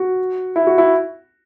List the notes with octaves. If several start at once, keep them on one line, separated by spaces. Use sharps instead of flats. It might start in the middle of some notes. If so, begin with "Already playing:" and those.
Already playing: F#4
E4
F#4
E4